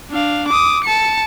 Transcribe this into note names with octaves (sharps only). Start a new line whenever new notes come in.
D4 F5
D6 D#6
A5 C#7